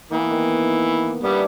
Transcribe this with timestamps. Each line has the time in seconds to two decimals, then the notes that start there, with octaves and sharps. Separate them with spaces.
0.11 E3 A#3 B3
0.31 D#3
1.23 G3 B3 D4 E4 G4